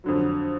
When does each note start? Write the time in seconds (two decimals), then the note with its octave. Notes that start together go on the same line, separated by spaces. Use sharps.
0.04 F2 D3 F#3